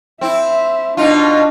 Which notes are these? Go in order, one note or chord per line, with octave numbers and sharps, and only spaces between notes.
C4 E4 E5
B2 D4 D#4 F4